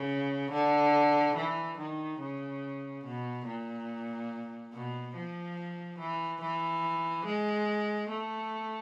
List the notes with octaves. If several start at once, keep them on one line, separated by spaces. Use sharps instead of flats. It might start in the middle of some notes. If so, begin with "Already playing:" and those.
Already playing: C#3
D3
E3
D#3
C#3
B2
A#2
B2
F3
E3
E3
G#3
A3